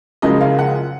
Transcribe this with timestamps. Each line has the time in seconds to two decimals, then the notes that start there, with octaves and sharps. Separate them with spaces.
0.22 F#1 F#2 C#3 F3 G#3 D#5
0.41 F5
0.59 F#5